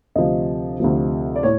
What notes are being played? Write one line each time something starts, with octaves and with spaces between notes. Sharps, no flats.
D2 C3 F3 D#5
D2 C3 F3
D5
A2 C#5